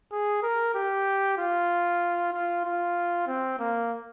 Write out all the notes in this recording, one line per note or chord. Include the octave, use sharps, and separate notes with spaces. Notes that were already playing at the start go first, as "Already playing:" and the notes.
G#4
A#4
G4
F4
F4
F4
C4
A#3